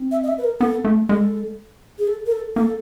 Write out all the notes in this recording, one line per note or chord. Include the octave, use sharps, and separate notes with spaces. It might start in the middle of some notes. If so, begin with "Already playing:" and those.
Already playing: C4
E5
D#5
E5
B4
A#4
B3 A4
A3
G#3 A4
G#4
A4
A#4
A4
A#3 A4